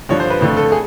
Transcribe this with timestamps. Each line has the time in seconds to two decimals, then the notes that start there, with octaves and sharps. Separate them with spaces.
0.09 G2 D3 F3 C#5
0.20 C5
0.30 B4
0.41 F2 D3 F3 A3
0.57 A4
0.72 G#4